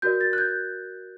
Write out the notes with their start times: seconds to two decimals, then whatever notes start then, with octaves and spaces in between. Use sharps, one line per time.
0.02 F#4 A#4 D5 G6
0.21 A6
0.33 F#6
0.38 G6